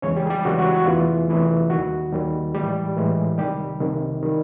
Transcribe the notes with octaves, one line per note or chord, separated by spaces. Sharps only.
E2 C#3 E3 G#3 C#4 C#5
G3 G4
G#4
G3 G4
E2 C#3 E3 G#3 F#4
F#4
F#4
E2 C3 E3 A3 F4
E2 C3 E3 A3
D#2 D#3 G3 F#4
D#2 D#3 G3
A2 E3 G3 G#3 G4
A2 E3 G#3
C2 C3 D#3 G3 G4
C2 C3 D#3
D#3 G3